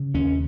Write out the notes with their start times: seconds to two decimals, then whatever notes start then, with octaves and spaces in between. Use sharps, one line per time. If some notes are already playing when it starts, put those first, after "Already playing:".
Already playing: C#3
0.14 D#2 C#4